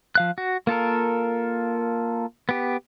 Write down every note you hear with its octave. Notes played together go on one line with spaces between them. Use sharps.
F3 F5 F#6
F#4
A#3 F4 A4 A#4
B3 G4